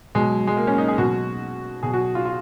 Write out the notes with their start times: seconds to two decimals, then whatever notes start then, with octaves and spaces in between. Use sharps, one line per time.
0.15 B2 F#3 G#3
0.47 G#3
0.57 A#3
0.67 C#4
0.78 D#4
0.88 G#4
0.98 B2 F#3 F#4
1.83 B2 F#3 G#4
1.93 F#4
2.15 F4
2.25 F4